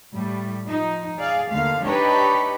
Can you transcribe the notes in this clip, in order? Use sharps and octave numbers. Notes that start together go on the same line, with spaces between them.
A2 G3
F3 D#4
G#4 D5 F5
D#2 D3 A3 F5
D4 D#4 G4 B4 C#5